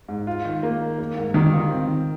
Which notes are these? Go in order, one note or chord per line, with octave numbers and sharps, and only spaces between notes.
G#2
F4
D#3
A#3
D#3
A#3
G#2
D#3 G3
F4
C4
D#3